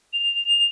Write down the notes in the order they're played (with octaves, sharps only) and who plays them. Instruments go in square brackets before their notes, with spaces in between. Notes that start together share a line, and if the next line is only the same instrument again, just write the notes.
[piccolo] F7